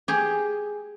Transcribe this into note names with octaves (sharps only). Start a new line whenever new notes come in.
G4 G#4